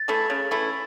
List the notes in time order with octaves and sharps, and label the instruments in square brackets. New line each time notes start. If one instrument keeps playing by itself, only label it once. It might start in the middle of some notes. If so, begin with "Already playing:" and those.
Already playing: [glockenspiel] A6
[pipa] E3 A3 E4
C#3
E3 A3 E4